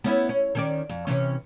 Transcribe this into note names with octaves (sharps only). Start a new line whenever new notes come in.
B3 C#4 E4
C#4
D#3 C#4 D5
F2
C3 E3 C#4